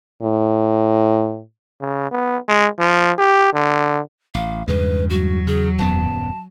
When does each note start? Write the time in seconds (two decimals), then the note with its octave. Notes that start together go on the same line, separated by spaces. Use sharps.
0.22 A2
1.81 C#3
2.11 B3
2.48 G#3
2.79 F3
3.19 G4
3.54 D3
4.35 A1 F5
4.68 E2 G2 C#3 G#3 B4
5.10 F#3 F#4
5.47 C#3 G#4
5.79 D#1 F#2 B3 A5